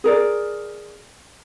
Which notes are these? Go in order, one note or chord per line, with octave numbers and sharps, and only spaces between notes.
G#4 A#4 D5